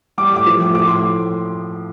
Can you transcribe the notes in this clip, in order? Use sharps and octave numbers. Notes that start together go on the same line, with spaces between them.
G3 D6
A2 D6
F3
A2
F3 D6
A2 C6